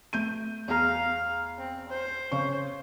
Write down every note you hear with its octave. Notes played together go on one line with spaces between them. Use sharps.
A3 G6 D#7
E2 G#4 F5 A#5
C4
C5
C#3 C#5 C#6